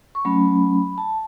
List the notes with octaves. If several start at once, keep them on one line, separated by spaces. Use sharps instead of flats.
C#6
F#3 A3 C#4 B5
A5